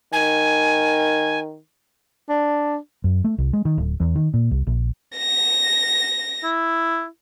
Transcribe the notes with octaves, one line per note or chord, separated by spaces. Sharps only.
D#3 G#5
D4
F#2
A3
C2
G#3
D#3
D1
E2
D#3
A#2
C2
A#1
A#6
E4